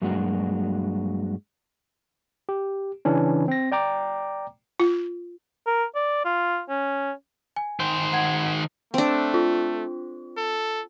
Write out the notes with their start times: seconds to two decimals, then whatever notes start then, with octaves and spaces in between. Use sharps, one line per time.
0.02 G2 F#3 G#3 A#3 D4 F#4
2.49 G4
3.05 C#3 E3 C#4 D4
3.48 C4 A#6
3.72 D5 G5 A#5 D6
4.80 F4
5.67 A#4
5.96 D5
6.25 F4
6.69 C#4
7.56 G#5
7.80 D#3 C5
8.13 F#5 G#6
8.94 A3 C4 D4
9.34 F4
10.37 A4